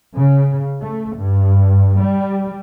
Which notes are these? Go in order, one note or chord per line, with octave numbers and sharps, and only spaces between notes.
C#3
A3
G2
G3